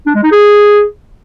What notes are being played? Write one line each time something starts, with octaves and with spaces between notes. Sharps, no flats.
D4
G#3
D#4
G#4